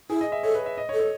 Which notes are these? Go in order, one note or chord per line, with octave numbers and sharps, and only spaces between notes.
E4 G#4
D#5
E5
A4 C#5
B4
E5
D#5
C#5
A4
C#5